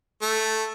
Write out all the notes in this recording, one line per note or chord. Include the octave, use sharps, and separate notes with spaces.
A3